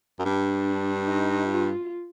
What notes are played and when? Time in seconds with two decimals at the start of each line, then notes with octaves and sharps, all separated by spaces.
0.19 F#2
0.25 G2 D4
1.07 D#4
1.47 F4